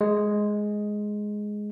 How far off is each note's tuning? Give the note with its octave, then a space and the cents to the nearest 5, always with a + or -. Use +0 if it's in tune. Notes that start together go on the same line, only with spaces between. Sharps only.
G#3 +5